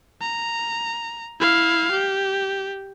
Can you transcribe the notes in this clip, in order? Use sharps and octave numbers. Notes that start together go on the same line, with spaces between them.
A#5
E4 F5
G4